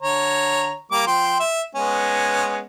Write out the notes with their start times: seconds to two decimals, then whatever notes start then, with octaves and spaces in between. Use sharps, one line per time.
0.02 D3 C#5 A#5
0.91 G3 A#3 D6
1.07 F3 G5 C6
1.40 E5
1.75 G#3 B3 C#4